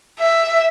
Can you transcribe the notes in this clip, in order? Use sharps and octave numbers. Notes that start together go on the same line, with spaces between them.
E5